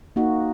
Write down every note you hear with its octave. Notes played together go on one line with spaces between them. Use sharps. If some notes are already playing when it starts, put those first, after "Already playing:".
A#3 D#4 F#4